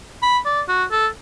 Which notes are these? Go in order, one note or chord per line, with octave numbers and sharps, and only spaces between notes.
B5
D5
F#4
A4